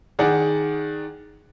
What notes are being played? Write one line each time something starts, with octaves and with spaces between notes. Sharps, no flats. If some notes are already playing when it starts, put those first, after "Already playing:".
D#3 G#4 D5 F#5